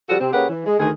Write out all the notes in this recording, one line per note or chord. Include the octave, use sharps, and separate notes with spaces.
C#3 F3 G3 F#4 A4 F#5
C3 C4
C#3 A#3 C#4 G4 B4 F#5
E3
G#3
D2 D#3 G#4